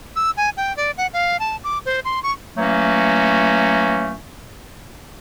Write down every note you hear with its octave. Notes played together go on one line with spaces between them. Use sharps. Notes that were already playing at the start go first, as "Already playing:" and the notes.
E6
G#5
G5
D5
F#5
F5
A5
D6
C5
C6
C#6
E3 F#3 A3 A#3 C#4